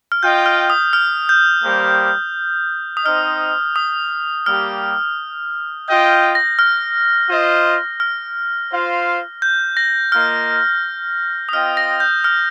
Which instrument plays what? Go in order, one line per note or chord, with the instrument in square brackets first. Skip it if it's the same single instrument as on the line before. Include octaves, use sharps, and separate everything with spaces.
[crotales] F6
[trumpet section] F4 D#5 G5 [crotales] G6
[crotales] F6
D#6
F6
G6
[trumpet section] G3 A#3 G4 C5
[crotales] D#6
[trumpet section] C4 D#4 C5 D#5 [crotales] F6
[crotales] D#6
[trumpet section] G3 A#3 G4 [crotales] F6
[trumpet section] F4 D#5 G5 [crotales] G6
[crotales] A#6
F6
[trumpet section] F4 C5 D#5
[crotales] F6
[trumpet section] F4 C5 F5
[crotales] G6
A#6
[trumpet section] A#3 F4 D#5 [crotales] F6
[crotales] D#6
[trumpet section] C4 F4 D#5 G5 [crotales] F6
[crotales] A#6
G6
F6